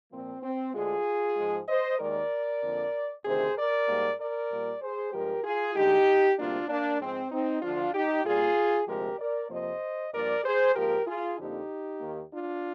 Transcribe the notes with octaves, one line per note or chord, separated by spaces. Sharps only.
A#2 F3 A#3 C4
C4
D2 D3 G#3 F4 G#4
G#2 F3 G#3
C5 D#5
D#2 D#3 G#3 A#4 D5
F2 D3 F3 A#3
D2 C3 D#3 G#4 C5
A#4 D5
G#2 G3 A#3
A#4 D5
A#2 G3 A#3
G#4 C5
G2 F3 G#3 G4 A#4
F4 G#4
D2 D3 G#3 D#4 G4
D2 C3 G3 A#3 D4 F4
A#3 D4
G#2 F3 G#3 C4
C4 D#4
D2 D3 F3 D4 F4
D#4 G4
A#2 G3 A#3 F4 G#4
D2 C3 F3 G#3 G4 A#4
A#4 D5
F2 C3 F3 A#3 C5 D#5
G2 F3 A#3 A#4 D5
G#4 C5
G#2 F3 A#3 G4 A#4
F4 G#4
F2 D3 F3 A#3 D#4 G4
D#2 D#3 A#3
D4 F4